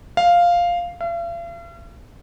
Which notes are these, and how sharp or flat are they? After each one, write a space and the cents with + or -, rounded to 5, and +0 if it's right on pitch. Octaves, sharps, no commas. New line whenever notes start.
F5 +0
F5 -45